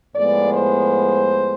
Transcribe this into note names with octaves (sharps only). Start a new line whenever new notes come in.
A2 F3 G#3 B3 D5
C5